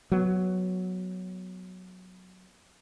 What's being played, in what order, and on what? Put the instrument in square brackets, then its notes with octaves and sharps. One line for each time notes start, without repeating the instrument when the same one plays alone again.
[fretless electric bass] F#3 B3